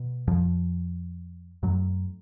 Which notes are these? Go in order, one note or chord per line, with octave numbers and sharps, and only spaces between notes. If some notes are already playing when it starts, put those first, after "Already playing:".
Already playing: B2
F2 F3
F#2 A2 F#3